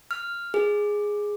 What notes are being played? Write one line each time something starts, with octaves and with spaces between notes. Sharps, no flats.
F6
G#4